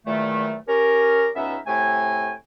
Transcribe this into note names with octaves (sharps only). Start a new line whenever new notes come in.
E2 A#2 D#3 F#3 A3
C#4 G4 A#4
C#2 B3 C#4 D#4 E5
A2 C3 A3 G5 G#5